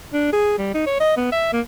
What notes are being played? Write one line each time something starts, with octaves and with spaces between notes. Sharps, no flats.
D4
G#4
G3
D#4
C#5
D#5
B3
E5
A#3